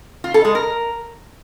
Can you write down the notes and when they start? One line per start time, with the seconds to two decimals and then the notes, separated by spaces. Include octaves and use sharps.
0.24 F4
0.34 A4
0.45 G#3
0.55 A#4